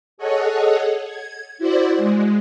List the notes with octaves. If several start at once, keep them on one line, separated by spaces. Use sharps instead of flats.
G#4 A4 C#5 D#5 F#5
G#6
E4 F#4 C5 D5 F#5
G#3